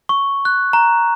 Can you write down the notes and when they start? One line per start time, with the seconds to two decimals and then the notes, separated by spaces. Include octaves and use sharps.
0.09 C#6
0.45 F#6
0.73 A#5